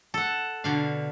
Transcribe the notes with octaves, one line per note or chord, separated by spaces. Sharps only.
A4 F#5
B2 D3 F5